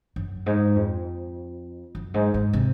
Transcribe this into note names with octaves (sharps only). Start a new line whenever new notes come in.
F#2
G#2
F2
F#2
G#2
G#2
C3